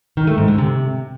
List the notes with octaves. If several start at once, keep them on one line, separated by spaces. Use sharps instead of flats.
D#3
A3
G#2
D3
C3